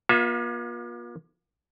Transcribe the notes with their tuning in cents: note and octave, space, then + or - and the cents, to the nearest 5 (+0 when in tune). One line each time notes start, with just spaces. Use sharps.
A#3 +45 F4 +30 E5 +0